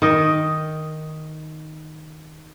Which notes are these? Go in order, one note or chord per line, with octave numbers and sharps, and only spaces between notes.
D#3 D#5